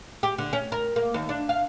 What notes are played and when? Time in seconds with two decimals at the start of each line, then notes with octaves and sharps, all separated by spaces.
0.23 G4
0.38 D3
0.53 C#4
0.72 A#4
0.96 A#3
1.14 D#2
1.29 D4
1.49 F5